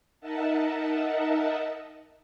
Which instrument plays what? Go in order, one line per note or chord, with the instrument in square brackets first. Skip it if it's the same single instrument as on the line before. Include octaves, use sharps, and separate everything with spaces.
[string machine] D#4 A#4 D#5 E5 F#5 A5